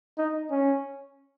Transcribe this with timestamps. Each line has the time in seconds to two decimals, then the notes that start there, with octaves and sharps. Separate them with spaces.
0.18 D#4
0.51 C#4